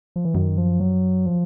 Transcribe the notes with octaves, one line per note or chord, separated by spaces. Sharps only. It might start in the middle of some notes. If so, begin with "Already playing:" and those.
F3
E3
F#2 D#3
F3
F#3
F3